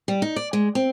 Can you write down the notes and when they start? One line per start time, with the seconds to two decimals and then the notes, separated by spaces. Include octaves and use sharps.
0.08 G3
0.22 D#4
0.36 D5
0.53 G#3
0.75 C4